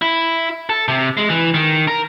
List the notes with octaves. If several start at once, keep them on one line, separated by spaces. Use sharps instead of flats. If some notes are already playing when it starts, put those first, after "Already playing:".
E4
A4
C3
G#3
E3
D#3
A#4